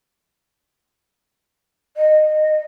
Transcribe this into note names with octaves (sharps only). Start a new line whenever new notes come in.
D#5